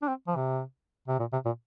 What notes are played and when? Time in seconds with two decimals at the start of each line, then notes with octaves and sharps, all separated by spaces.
0.02 D4
0.08 C4
0.28 F3
0.36 C3
1.08 C3
1.20 A#2
1.33 C3
1.45 A#2